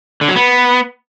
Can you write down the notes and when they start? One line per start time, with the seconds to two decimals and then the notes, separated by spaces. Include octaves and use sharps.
0.21 D3
0.28 F#3
0.36 B3